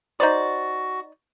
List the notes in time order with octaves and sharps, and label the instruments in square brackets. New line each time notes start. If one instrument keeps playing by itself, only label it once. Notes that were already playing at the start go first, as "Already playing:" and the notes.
[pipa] D#4 C5 D5 [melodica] F#4